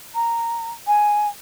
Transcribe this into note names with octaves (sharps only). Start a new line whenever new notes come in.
A#5
G#5